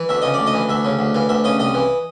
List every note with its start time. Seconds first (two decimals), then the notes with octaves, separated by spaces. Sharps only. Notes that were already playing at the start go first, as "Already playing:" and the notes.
Already playing: E3
0.09 D2 E5
0.22 C#3 D#5
0.34 D2 D5
0.47 D#5
0.54 E3
0.69 D2 E5
0.85 C#3
0.99 D2
1.14 E3 F5
1.29 D2 E5
1.44 C#3 D#5
1.59 C2 D#5
1.74 E3